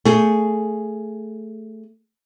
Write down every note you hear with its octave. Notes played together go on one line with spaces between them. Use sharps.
A3 G#4